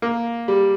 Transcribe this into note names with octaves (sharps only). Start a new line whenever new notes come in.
A#3
G3